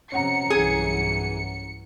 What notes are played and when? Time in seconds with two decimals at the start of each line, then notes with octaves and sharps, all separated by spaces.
0.12 F2 C3 C#4 F#5 A#5 C#7
0.50 B1 G2 E3 G#4